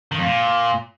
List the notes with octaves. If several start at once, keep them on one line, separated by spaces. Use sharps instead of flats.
D#3
F2
A#2